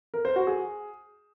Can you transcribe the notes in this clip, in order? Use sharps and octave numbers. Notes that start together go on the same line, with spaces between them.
A#4
C5
F#4
G#4